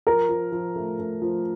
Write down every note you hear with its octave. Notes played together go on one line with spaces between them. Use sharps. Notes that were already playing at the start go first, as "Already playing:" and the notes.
F3 A#4
F3
F3
A3
A3
F3